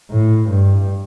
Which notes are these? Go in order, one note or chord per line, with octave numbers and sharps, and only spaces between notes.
A2
G2